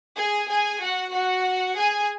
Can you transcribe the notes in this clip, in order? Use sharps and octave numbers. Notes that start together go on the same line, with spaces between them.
G#4 G#5
G#4 G#5
F#4 F#5
F#4 F#5
G#4 G#5